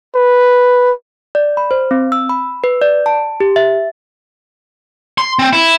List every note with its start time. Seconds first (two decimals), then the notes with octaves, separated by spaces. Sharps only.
0.15 B4
1.35 D5
1.57 B5
1.71 C5
1.91 C4
2.12 E6
2.29 B5
2.64 B4
2.81 D5
3.06 A5
3.40 G4
3.56 E5
5.18 C6
5.39 C4
5.53 E4